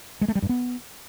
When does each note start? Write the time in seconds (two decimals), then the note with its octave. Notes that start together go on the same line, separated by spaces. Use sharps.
0.21 G#3
0.28 A3
0.35 G3
0.42 G2
0.49 B3